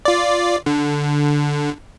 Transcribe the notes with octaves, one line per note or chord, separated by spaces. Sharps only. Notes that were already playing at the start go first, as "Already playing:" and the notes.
F4 D5
D3